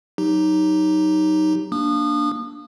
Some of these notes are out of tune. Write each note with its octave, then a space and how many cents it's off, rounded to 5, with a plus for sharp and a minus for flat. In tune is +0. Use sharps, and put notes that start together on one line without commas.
F#3 +0 D#4 +0 G4 -5
A#3 +0 D4 +0 D#6 -30